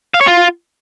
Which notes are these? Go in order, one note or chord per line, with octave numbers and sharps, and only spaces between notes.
F5
C#5
F4